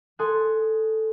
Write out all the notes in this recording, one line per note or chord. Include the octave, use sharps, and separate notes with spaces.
A4 G#5 C6 D#6 F#6